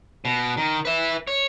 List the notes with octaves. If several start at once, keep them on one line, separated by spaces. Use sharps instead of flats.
B2
D#3
B4 E5
C#5